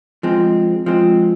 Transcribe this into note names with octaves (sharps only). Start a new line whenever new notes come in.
F3 G#3 C4
F3 G#3 C4